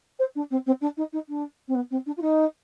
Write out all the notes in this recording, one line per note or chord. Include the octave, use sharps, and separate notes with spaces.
C5
D4
C4
C4
D4
D#4
D#4
D4
C4
B3
C4
D4
F4
D#4